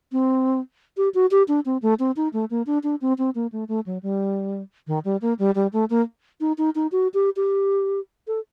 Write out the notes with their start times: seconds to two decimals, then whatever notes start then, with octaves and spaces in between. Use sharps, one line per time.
0.12 C4
0.97 G4
1.14 F#4
1.31 G4
1.48 D4
1.66 C4
1.82 A3
1.99 C4
2.16 D#4
2.33 A3
2.50 A#3
2.67 D4
2.83 D4
3.01 C4
3.18 C4
3.35 A#3
3.52 A3
3.68 A3
3.86 F#3
4.03 G3
4.87 D#3
5.05 G3
5.22 A#3
5.39 G3
5.55 G3
5.73 A3
5.90 A#3
6.41 D#4
6.58 D#4
6.75 D#4
6.92 F#4
7.14 G4
7.36 G4
8.28 A4